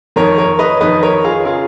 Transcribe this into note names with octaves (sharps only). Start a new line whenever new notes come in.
F2 D#3 A#4 C#5
A#4 C#5
B4 D#5
F2 D#3 B4 D#5
A#4 C#5
F4 G#4
C#3 F4 G#4